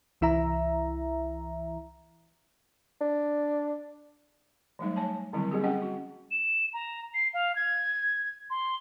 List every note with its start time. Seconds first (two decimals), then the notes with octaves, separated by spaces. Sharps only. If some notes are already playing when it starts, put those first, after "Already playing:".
0.21 C2 E3 E4 E5 A#5
3.01 D4
4.79 E3 F#3 G3 A3 D#4
4.96 C#5 G#5 A5
5.33 D3 D#3 F#3 G3 C4 E4
5.51 G3 A#3 C4 G4 G#4
5.64 C#4 G4 D#5 F#5 G5
5.82 F#4
6.31 E7
6.73 A#5
7.14 C7
7.34 F5
7.56 G#6
8.50 C6